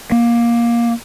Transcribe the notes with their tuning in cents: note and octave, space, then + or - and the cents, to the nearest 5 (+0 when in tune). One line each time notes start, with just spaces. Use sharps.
A#3 +15